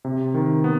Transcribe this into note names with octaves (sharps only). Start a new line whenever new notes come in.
C3
D#3
B3